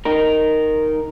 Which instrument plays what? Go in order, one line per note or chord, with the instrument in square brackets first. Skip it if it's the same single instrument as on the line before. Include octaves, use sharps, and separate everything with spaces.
[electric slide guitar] D#4 A#4